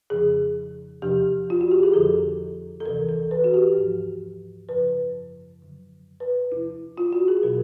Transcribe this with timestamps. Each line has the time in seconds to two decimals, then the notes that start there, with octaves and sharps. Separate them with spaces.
0.10 F2 C#3 F3 G#4
1.02 E2 C3 F3 G4
1.50 F4
1.61 F#4
1.71 G4
1.83 G#4
1.94 F2 D3 F3 A4
2.80 A4
2.85 D2 C3 E3 A#4
3.09 A4
3.31 B4
3.44 F#4
3.54 G4
3.77 G#2 F3
4.69 F#2 C#3 F3 B4
5.60 F#2 D3 F#3
6.20 B4
6.52 E2 C3 F3 E4
6.98 F4
7.13 F#4
7.28 G#4
7.42 B2 F#3 A#4